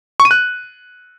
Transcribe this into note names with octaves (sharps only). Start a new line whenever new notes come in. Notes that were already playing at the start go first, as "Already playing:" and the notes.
C#6
D#7
F#6